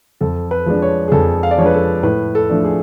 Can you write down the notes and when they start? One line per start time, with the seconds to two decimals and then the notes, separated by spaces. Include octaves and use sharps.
0.21 F2 A4
0.51 B4
0.66 F3 G#3 D4
0.82 C#5
1.08 G#4
1.12 F2 A4
1.43 F5
1.51 D5
1.58 F3 G#3 D4 C#5
1.66 B4
1.74 A4
2.03 A2 B4
2.35 A4
2.50 F3 A3 D4
2.65 G#4